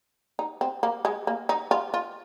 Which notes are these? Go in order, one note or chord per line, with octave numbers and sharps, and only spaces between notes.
D#4
C4
A#3
G#3
A#3
D#4
F4
F4